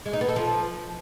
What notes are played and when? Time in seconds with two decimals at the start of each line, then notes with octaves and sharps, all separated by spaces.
0.06 G#3
0.13 D#4
0.21 B3
0.29 A4
0.36 F3